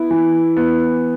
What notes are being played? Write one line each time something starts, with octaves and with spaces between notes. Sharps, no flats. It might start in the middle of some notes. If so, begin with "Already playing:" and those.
Already playing: B3 E4
E3
B3